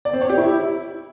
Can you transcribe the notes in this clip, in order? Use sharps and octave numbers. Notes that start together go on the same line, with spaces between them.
D5
C4
C#5
G4
E4